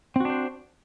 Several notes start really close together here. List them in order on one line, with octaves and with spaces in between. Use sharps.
C4 F#4 D4 C5